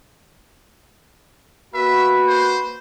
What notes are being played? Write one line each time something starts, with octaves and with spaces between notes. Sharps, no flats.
A#3 F#4 B4 E5
C5